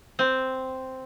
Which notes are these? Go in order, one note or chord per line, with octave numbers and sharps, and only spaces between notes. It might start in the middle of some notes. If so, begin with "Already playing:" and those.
C4